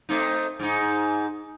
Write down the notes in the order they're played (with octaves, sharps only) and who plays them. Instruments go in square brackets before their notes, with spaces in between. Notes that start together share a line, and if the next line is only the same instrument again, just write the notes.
[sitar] A3 C4 D#4
G#2 D#4